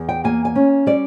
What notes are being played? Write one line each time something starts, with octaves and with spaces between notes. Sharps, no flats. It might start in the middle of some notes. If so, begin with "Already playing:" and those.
Already playing: E2
G5
A#3 G#5
G#5
C#4
G3 D5